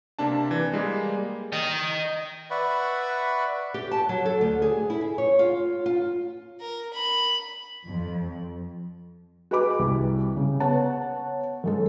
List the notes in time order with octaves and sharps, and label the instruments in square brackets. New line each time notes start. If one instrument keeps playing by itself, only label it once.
[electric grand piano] C3 A#3 D4 A5
E3
G3 G#3 A#3
[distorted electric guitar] D#5 G5
[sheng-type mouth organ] B4 D5 E5 F#5 B5 C#6
[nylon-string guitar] G4
A5
F#3
A4
D2
G#4
E4
G#4
C#5
F4
F4
[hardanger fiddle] A#4
B5
[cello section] F2
[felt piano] F#4 G#4 B4 D#5 B5 D6
C2 G3
C#3
B3 C#5 F#5 A5
F#2 G#3 A4